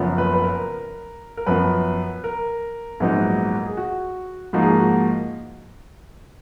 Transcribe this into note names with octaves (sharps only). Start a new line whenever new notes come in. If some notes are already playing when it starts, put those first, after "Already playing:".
Already playing: F#1 F#2 F3 B3
B4
B4
A#4
A#4
F#2 F3 B3 B4
A#4
A#1 G#2 F#3 B3 D#4
G#4
F#4
G#2 F3 A#3 D#4 F#4
G#4
F#4
F#4